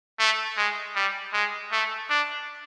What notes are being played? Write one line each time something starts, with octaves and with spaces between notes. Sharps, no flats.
A3
G#3
G3
G#3
A3
D4